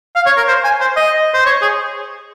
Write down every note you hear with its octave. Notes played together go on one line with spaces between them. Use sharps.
F5
C#5
A#4
C5
G#5
C5
D#5
C5
C#5
G#4